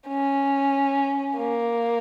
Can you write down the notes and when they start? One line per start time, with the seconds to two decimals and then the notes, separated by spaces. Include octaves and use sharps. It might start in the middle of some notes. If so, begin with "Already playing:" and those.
0.08 C#4
1.37 A#3